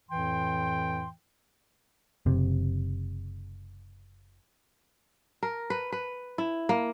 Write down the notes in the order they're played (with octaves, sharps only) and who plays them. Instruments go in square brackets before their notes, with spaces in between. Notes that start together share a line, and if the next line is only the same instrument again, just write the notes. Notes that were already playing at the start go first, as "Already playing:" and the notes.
[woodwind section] F2 A2 E3 G5 C6
[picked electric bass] F#1 C3
[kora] A#4
B4
B4
E4
A#3